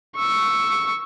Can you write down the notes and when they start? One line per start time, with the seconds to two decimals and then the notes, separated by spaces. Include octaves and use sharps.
0.16 C#6 E6